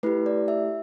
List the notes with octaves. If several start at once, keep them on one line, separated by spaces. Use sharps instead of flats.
A3 E4 G4 B4
D5
E5